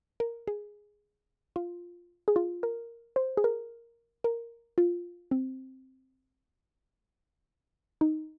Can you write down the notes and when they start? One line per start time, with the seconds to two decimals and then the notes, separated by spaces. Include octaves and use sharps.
0.20 A#4
0.47 G#4
1.56 F4
2.28 G#4
2.36 F4
2.63 A#4
3.16 C5
3.37 G#4
3.44 A#4
4.24 A#4
4.78 F4
5.31 C4
8.01 D#4